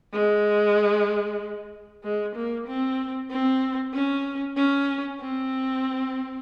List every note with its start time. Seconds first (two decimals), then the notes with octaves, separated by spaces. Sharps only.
0.13 G#3
2.03 G#3
2.35 A#3
2.67 C4
3.30 C4
3.94 C#4
4.57 C#4
5.20 C4